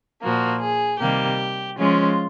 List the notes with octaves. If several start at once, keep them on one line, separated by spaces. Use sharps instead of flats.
A#2 F3 A#3 F#4
G#4
C3 D#3 G3 A#3 G4
F3 G#3 C#4 F4